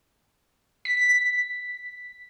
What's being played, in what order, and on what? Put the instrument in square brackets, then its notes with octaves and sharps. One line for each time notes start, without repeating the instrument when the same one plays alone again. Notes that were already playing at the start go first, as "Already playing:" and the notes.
[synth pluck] B6